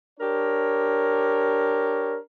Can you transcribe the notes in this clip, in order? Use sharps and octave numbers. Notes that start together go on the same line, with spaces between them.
D4 G4 A#4 C#5